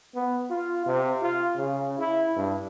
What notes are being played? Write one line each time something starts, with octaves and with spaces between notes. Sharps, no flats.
B3
F4
C3
F4
C#3
E4
G2